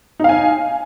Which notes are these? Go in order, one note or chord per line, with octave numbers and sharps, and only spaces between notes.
D#4 F5 G#5